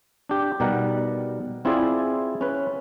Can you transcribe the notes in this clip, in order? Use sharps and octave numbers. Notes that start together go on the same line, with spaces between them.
D4 G4
B2 G3 D#4 A#4 F#5
C4 E4 F4 G#4 D5
C#4 B4